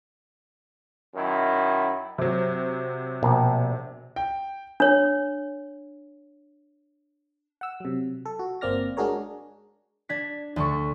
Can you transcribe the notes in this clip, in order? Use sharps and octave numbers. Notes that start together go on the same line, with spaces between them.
F#2 D#3 E4
C3 F#3
A#1 B2
G5
D4 C#5
F#5 E6
C3 F#3
A4
F#4
G1 A#3 C4 D5 F6 A#6
G#3 D4 F#4 G#4 A#4 C#5
D4 G#6 B6
D2 D3 C#6